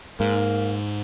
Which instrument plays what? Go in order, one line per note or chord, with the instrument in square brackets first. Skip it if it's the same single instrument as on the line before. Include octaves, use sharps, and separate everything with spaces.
[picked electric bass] G#2 [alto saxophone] A#3